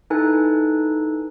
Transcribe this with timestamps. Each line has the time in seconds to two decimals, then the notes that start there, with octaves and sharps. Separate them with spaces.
0.10 D#4 E4 A4 B4 G#5